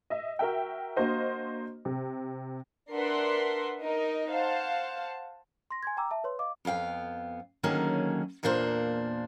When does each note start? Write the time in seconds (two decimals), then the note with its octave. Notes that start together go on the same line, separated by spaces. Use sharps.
0.10 D#5 E5
0.39 F#4 A#4 E5 G5
0.96 A#3 D4 F#4 C5 D#5
1.85 C3
2.92 D4 A#4 B4 E5 F#5 C6
3.83 D#4 A#4 D#5
4.31 C5 F5 F#5 A5
5.71 C6 A#6
5.83 G#5 C6 G#6
5.97 G5 A#5 D6 E6
6.11 E5 A5
6.24 B4 C#5 C6
6.39 D#5 F5 D6
6.65 F2 B3 F5 G5
7.63 D3 D#3 F#3 A#3 C#4 G#4
8.43 E2 A#2 A#3 D4 F4 C5